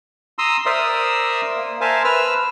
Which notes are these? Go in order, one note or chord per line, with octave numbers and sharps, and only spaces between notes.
A#5 C6 D#6 E6
A#4 C5 D5 E5 D#6 E6
A#3
A#4 C5 E5 G#5 A5
B4 E6 F6